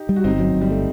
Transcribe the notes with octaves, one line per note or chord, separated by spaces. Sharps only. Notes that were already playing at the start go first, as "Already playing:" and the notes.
Already playing: D#4 G4
G3
F#4
G1 C4 D#4
F#3
G1
G3
A3